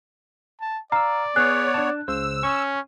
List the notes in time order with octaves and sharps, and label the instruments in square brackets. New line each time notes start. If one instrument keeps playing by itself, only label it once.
[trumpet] A5
[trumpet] D5 [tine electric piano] F5 E6 [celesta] A#5
[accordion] B3 C#5 [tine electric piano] G#4 [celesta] F#6
[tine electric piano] D4 A5
[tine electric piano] C#2 C#3 C5 [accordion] E6
[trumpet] C#4 [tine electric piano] C#6